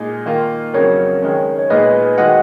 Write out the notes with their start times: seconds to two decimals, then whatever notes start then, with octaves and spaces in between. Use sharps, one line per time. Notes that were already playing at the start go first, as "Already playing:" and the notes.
Already playing: A#2 G#3 D#4 G#4
0.26 D#3 A#3 F4
0.74 F2 C#3 F#3 A#4 C#5
1.22 D#3 G#3 C#4
1.59 C#5
1.70 A#2 G#3 B3 D#4 G#4 B4 D#5
2.18 D#3 G#3 D#4 F#4 D#5 F#5